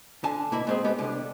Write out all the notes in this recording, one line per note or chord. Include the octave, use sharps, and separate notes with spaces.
D3 G#5 A5
B2 A#3 E4 B5
G#3 C4 G#4
G#3 B3 G4
C2 D3